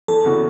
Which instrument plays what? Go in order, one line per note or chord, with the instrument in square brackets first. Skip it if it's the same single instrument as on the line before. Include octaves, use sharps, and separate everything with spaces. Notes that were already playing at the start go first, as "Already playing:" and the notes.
[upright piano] E2 [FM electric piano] A4
[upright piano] C#3 E3 B3 F#4